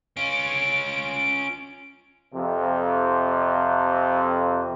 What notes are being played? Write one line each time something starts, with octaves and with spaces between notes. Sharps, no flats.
C#4 F4 D7
F2 C3